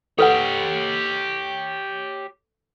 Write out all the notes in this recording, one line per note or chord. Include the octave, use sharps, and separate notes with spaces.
G4 A4 B4 C#5 F#5